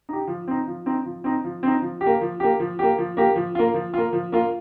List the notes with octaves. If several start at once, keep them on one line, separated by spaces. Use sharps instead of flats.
D#4 G4
F3
C4 D#4
F3
C4 D#4
F3
C4 D#4
F3
C4 D#4
F3
G4
A#3
F3
A#3 G4
F3
A#3 G4
F3
A#3 G4
F3
A#3 F4
F3
A#3 F4
F3
A#3 F4